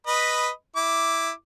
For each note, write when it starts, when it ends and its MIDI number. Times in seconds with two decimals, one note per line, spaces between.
0.07 0.49 71
0.07 0.49 75
0.07 0.49 83
0.76 1.30 64
0.76 1.30 86